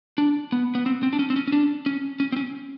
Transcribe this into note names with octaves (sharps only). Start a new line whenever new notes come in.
D4
B3
B3
C4
C4
D4
C#4
C4
C#4
C#4
D4
C#4
C#4
C4
C#4